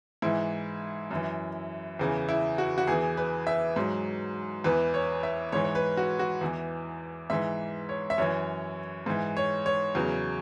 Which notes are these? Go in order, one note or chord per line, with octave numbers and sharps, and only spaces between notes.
G#2 E3 E4
F#2 E3
E2 C#3 E3
E4
F#4
F#4
E2 E3 G#4
B4
E5
G#2 F#3
E2 E3 B4
C#5
E5
G#2 E3 C#5
C#5
B4
F#4
F#4
E2 E3
G#2 E3 E5
C#5
E5
F#2 E3 C#5
G#2 E3
C#5
C#5
E2 C#3 F#3